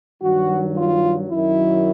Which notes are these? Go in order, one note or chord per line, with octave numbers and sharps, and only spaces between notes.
G2 D#3 F#3 F#4
F4
F#2 D#3 F#3 E4